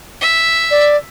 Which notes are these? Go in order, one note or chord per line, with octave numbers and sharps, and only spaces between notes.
E5
D5